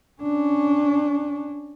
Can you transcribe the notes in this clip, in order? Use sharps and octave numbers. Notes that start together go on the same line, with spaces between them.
C#4 D4